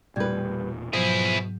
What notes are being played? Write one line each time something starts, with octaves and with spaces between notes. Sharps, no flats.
E1 A#2 G3 A3 B4 G#6
G#2 B2 F3 F#3 E4 G#4